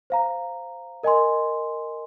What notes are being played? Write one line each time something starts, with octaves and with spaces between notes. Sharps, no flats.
C5 F5 A#5
A#4 D#5 G#5 C6